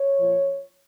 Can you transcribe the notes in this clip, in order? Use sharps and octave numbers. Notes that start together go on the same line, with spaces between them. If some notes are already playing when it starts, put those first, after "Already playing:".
Already playing: C#5
A#2 F3